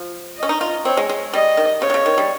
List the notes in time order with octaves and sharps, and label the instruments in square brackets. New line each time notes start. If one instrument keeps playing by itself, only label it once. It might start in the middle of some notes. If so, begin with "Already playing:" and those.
Already playing: [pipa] F3
[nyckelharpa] D#5
[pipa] C#4
D#4
F4
[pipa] C4 [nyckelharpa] C#5
[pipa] G#3
G#3
[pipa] G3 [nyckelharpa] D#5
[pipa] D#3
[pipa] C#3 [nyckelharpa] C#5
[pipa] C3
C#3
D#3
G3